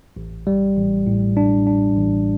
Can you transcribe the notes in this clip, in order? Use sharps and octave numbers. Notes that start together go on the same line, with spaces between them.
A1
G3
A1
A2
D4
D4
A1